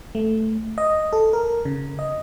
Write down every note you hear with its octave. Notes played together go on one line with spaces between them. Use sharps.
A3
D#5
A4
A#4
C#3
D#5